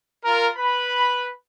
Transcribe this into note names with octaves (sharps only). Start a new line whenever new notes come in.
F4 A#4
B4 B5